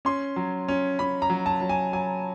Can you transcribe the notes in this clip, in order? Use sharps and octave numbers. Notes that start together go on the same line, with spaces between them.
C#4 C6
F#3
C#4
C#4 B5
A#5
F#3
A5
F#3
G#5
F#3 G#5